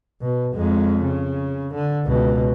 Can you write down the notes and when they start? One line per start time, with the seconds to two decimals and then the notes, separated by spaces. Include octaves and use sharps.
0.22 B2
0.54 F2 G#3
1.01 C#3
1.74 D3
2.05 C#2 B2